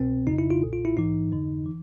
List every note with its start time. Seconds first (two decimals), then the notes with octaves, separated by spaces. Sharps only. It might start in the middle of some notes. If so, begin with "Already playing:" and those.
Already playing: C2 B2 C4
0.27 G1 F2 C#3 D#4
0.38 E4
0.50 F4
0.62 B1 A#2
0.73 F4
0.85 E4
0.96 A#1 G#2 E3 D#4
1.32 F2 D3
1.66 E3